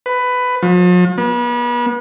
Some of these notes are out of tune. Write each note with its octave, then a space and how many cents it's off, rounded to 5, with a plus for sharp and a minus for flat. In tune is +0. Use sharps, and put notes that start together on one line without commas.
B4 +15
F3 +45
B3 -35